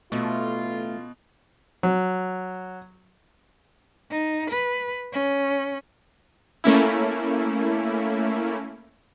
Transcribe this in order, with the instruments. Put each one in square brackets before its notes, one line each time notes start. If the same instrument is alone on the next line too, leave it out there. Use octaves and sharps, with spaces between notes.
[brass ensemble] A1 F4 [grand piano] B2 [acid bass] A3
[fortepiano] F#3
[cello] D#4
B4
C#4
[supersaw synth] A3 A#3 C#4 E4